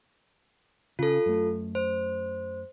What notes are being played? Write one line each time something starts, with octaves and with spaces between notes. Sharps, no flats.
C#3 F4 A4
F#2 A3
C5